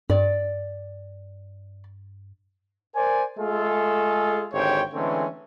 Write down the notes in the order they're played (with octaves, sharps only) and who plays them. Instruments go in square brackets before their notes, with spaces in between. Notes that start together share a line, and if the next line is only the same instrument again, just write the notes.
[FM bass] G2 [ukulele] D5
[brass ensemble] A#4 C5 D5 G#5
G#3 A3 F4 G#4 A4
G#1 D3 G4 C5 C#5 G5
D3 E3 G#3 A3 C4 C#4